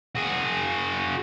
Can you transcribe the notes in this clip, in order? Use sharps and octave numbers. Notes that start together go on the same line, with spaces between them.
F#4 G#4